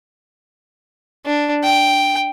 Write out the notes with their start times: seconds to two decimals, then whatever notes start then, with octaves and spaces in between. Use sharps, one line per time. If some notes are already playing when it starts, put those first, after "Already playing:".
1.26 D4
1.63 G5